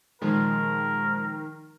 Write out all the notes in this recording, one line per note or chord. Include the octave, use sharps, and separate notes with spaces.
A#2 D#3 F3 G#3 A#4